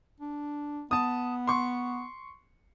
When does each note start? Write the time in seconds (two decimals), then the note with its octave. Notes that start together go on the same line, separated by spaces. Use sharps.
0.20 D4
0.91 B3 A5 D#6
1.47 C6 C#6